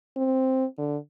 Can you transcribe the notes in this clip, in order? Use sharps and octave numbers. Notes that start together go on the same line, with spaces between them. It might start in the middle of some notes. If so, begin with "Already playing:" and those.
C4
D3